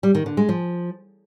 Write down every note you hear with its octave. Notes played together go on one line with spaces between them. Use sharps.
G3
D#3
D3
G#3
F3